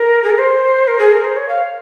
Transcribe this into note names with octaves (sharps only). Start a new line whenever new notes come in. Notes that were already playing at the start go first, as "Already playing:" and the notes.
Already playing: A#4
G#4
A#4
C5
A#4
G#4
A#4
C5
C#5
F5